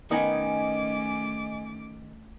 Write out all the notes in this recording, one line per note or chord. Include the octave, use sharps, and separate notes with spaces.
D#3 A3 B3 C#4 D#4 D#5 G#5 D6